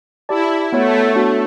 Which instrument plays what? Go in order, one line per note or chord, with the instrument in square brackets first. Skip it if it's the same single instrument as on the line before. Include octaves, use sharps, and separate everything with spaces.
[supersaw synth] E4 [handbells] G4 D5 A5
[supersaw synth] A3 [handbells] B3 F#4 C#5 F#5
[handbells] B3 D4 F#4 C#5